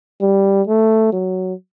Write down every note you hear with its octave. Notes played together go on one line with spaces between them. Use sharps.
G3
A3
F#3